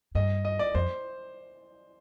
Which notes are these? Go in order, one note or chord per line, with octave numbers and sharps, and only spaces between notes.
G2 D#5
D#5
D5
F2 C5